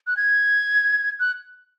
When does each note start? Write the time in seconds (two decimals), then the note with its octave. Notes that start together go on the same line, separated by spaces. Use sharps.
0.07 F#6
0.17 G#6
1.20 F#6